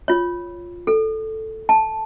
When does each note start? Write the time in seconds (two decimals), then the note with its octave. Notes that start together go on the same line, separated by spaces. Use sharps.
0.08 F4 C#5
0.87 A4
1.69 A5